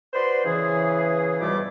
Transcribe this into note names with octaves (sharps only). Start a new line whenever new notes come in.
F#4 B4 C5 D5 C6
C#3 E3 G#4
C#2 G#2 B2 G3 A3 D6